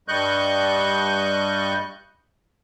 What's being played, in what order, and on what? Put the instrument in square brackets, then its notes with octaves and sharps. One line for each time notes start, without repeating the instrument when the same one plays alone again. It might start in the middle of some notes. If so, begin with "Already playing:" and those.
[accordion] G2 G3 D#5 C#6 F#6 G6